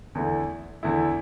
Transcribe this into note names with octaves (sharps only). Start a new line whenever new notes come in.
E2 D3 A3 E4
E2 D3 A3 E4